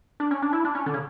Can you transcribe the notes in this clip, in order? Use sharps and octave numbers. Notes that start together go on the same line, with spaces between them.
D4
C#4
D4
E4
D4
C#4
D3
C#3